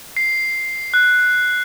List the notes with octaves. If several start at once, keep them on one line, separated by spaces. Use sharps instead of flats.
C7
F#6